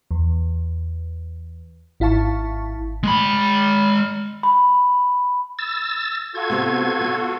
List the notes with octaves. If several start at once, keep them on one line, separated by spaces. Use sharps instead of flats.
E2
G#1 E4 F5 A5 C#6
G#3 B5
B5
E6 A6
F4 F#4 A4 G#6
C3 B3 C4
B3 C#5